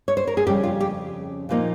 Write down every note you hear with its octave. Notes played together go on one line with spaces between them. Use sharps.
C#5
C5
A#4
G#4
F2 C#3 G3 C#4 G4
F4
G4
A#2 F3 A#3 D#4